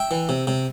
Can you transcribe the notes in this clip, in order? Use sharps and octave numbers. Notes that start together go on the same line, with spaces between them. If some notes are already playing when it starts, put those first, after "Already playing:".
Already playing: E5 G5
E3
C3
C3